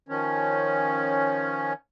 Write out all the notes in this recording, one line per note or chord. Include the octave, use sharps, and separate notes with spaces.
D#3 F3 C#4